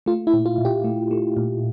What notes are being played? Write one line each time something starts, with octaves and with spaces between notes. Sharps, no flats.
A3 F4
E4
A#2
F4
A#2
G4
A3
A3
A#2